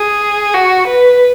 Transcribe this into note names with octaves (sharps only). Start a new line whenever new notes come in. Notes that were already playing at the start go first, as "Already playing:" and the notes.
Already playing: G#4
F#4
B4